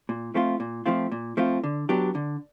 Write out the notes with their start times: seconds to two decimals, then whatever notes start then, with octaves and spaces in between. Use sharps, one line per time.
0.09 A#2
0.34 F3 A3 C4 F4
0.60 A#2
0.86 F3 A3 C4 F4
1.12 A#2
1.37 F3 A3 C4 F4
1.64 D3
1.89 F#3 B3 D4 G4
2.15 D3